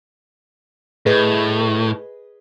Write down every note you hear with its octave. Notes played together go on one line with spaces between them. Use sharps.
A2 G#4 B4 D#5